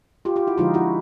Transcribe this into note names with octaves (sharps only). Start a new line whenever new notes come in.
F4 G4
F4 G4
E4 F#4
D3 F3 G#3 D#4 F4
E4 F#4